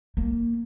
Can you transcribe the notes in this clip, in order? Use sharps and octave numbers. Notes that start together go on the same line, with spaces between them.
A#3